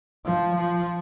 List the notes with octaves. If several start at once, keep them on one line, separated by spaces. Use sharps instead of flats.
F3
F3